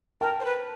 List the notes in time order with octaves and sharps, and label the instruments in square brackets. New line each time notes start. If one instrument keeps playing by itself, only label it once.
[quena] A#4 [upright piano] G5 A5
[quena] C5
B4